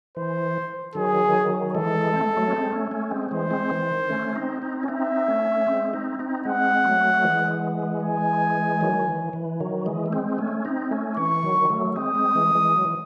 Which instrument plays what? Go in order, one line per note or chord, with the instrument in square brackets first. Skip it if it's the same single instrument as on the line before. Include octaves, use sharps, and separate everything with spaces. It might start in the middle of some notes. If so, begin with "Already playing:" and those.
[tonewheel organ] E3 [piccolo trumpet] C5
[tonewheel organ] D#3 F#3 [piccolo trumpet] G#4
[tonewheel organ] E3 G#3 [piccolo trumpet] A4
[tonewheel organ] C4
A3
G#3
F#3 A3
C#4
G#3 C4
A3 C#4
A3 C#4
G#3 C4
[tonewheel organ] E3 G#3 [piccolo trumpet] C5
[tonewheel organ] G#3 C4
E3
D#3
A3 C#4
C4 D#4
C4 D#4
C#4
[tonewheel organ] C4 D#4 [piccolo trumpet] E5
[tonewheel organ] A3 C#4
G#3 C4
C4 D#4
C4 D#4
[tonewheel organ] G#3 C4 [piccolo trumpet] F#5
[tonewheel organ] F#3 A3
E3 G#3
[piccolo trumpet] G#5
[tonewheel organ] D#3 F#3
E3
E3
D#3 F#3
E3 G#3
A3
G#3 C4
A3 C#4
C4 D#4
A3 C#4
[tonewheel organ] E3 [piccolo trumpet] C#6
[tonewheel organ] D#3 F#3
F#3 A3
[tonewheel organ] G#3 C4 [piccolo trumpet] D#6
[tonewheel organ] G#3 C4
E3 G#3
E3 G#3
F#3
E3